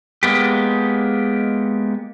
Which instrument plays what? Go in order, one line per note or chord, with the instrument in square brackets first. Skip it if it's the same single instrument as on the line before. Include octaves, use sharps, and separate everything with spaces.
[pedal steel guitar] G#3 A#3 B3 G4